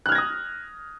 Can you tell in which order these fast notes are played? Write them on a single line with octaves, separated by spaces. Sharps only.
F#6 F6 G#6 A#6 D#6